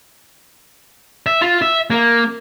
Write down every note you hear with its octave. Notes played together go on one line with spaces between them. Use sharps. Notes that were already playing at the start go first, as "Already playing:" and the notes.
E5
F4
E5
A#3